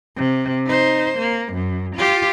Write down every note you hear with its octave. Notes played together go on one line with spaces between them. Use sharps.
C3
D#4 C5
A#3
F#2
F4 G4